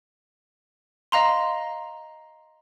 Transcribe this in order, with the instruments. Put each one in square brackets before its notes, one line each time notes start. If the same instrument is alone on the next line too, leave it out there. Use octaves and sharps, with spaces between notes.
[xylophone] D#5 F5 A#5 C6